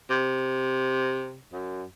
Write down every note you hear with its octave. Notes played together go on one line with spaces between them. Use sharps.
C3
F#2